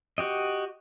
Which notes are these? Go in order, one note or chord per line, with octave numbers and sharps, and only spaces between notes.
F#4 G4 D#5